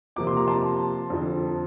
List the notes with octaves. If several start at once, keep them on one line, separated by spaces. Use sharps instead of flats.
C3 F3 A#3 D6
C6
A#5
A5 C6
F2 D3 F3